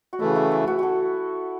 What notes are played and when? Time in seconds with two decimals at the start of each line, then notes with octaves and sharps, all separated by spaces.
0.13 F#4
0.20 C#3 E3 A3 E4
0.36 E4
0.52 E4
0.67 F#4
0.79 F#4 A4